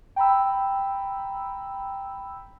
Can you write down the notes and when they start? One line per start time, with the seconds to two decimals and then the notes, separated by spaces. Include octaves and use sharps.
0.16 G5 A#5 B5 E6